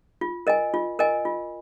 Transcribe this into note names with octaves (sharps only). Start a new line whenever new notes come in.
F4
A#4 D#5 G#5
F4
A#4 D#5 G#5
F4